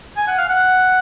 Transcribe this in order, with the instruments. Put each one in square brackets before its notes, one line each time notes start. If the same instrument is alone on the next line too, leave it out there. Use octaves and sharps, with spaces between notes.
[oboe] G#5
F#5
F5
F#5